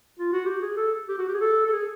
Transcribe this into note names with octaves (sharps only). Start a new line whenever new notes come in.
F4
F#4
G4
G#4
A4
G4
F#4
G4
G#4
A4
A4
G#4